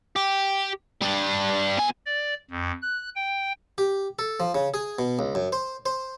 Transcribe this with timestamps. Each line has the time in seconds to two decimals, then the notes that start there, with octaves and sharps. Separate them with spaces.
0.16 G4
1.02 G3 D4
1.78 B2 G#5
2.06 D5
2.50 F2
2.82 F#6
3.16 G5
3.78 G4
4.19 A4
4.40 F3
4.55 C#3
4.74 G#4
4.99 B2
5.19 C#2
5.35 F#2
5.52 C5
5.86 C5